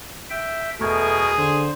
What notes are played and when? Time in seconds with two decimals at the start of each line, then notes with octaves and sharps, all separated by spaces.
0.30 E5 G5
0.80 E2 B2 A3 G#4 A#4 C#6 G#6
1.38 D3 C5